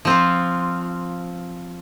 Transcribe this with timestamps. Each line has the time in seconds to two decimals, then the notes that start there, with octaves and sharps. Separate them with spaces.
0.05 F3 C4 F4